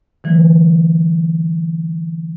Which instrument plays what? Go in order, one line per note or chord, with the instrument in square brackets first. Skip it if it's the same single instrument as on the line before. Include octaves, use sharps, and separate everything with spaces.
[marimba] D3 E3 F#3 A3